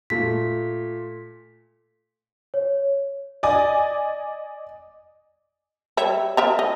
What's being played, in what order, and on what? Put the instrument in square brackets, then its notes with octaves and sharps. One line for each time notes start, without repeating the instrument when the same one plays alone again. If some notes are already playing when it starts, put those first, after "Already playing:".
[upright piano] A#2 A3 [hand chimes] B6
[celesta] C#5
[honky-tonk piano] D5 D#5 G#5
[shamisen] G3 C#5 E5
A#4 E5 A#5
D#5